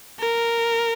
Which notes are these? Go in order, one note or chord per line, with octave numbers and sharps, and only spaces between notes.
A#4